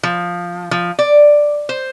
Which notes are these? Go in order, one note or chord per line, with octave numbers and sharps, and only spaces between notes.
F3
F3
D5
C5